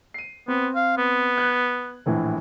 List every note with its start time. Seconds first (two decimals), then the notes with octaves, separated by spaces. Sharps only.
0.14 C7 D#7
0.48 B3 C4
0.75 F5
0.97 B3
1.38 F#6 G#6
2.06 A#1 A2 E3